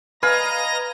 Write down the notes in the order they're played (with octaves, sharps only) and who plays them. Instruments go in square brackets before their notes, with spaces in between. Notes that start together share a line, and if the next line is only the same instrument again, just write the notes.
[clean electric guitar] B4 [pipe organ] D#5 A#5 A#6 [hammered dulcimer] F5 G#5